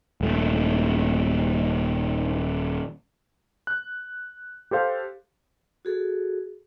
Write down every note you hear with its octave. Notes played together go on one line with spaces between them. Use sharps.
D#1 A3
F#6
G4 A4 C5 F5
F#4 G#4 A4